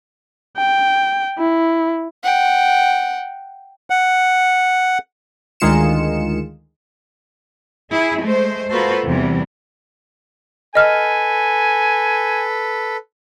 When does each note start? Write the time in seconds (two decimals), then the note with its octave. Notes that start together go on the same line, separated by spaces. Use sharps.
0.57 G5
1.38 E4
2.24 F#5 G5
3.90 F#5
5.60 D2 D#3 G#3 F4 C#7 E7
7.90 E4 G#4
8.20 G#3 A3 C5
8.70 A#3 F4 F#4 A4 B4 C5
9.05 E2 C3 E3 G3
10.75 A4 B4 D#5 G#5 F6